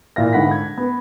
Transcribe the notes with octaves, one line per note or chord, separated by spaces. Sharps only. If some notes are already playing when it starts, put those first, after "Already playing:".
A#2 E4 E5 F5 A#6
G#2 D3 F#5 B5 B6
G#6
B3